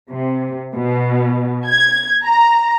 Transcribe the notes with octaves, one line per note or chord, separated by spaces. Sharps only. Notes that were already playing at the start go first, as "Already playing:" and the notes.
C3
B2
G#6
A#5